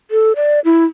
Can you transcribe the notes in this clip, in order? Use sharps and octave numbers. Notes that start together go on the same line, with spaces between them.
A4
D5
E4